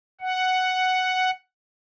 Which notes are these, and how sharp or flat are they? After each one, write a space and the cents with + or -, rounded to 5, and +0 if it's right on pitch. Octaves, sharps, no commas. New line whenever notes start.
F#5 +5